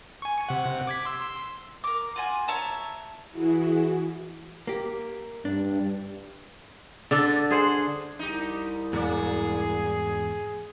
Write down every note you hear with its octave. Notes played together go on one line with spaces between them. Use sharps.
G#5 C#6
C3 F#5
D6 G#6 B6
C6 E6
A#4 D6
F4 F#4 G#5
C#5 E5 A5 A#5
E3 E4 F#4 G#4
A#3 G4
G2 D4
D3 D4 A4
G#4 C5 F#5
C2 D#4 G4
E2 G#2 F#3 A#3 G#4 D5